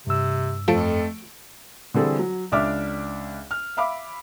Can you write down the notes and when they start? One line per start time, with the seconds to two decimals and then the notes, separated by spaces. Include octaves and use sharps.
0.07 G2 C3 E6
0.68 F2 F3 A3 A4 D7
1.94 D3 E3 G3 C4 G#4 A4
2.19 F#3
2.52 C#2 D4 E5 D6 F6
3.51 F6
3.77 E5 F5 B5 D6